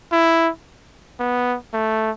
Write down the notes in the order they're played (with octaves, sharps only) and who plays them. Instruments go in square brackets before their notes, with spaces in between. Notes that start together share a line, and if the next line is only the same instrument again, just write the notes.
[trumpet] E4
B3
A3